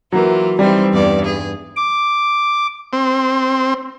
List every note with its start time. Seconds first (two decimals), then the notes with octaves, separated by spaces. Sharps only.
0.13 E3 F#3 A#3 F4
0.59 E3 G3 C4 D#4
0.93 E2 G2 D5
1.25 G#4
1.76 D6
2.93 C4